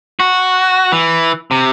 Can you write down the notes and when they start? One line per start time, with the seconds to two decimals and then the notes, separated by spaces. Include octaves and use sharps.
0.20 F#4
0.92 E3
1.51 C3